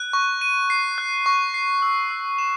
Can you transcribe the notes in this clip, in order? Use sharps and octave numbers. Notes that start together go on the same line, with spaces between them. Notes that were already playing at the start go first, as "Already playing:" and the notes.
Already playing: F#6
C#6
D#7
C7
F#6
C#6
C7
E6
E6
E7